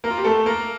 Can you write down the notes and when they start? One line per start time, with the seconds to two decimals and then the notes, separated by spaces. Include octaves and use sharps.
0.04 A#3 A#4
0.10 F4
0.18 G4
0.24 A3 A4
0.46 A#3 A#4